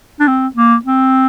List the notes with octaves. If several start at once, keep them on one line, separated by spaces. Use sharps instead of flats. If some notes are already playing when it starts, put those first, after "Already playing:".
D4
C4
A#3
C4